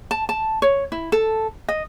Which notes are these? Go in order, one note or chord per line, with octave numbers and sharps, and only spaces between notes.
A5
A5
C#5
E4
A4
D#5